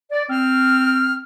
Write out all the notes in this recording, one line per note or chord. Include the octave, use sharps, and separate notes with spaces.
D5
C4 F6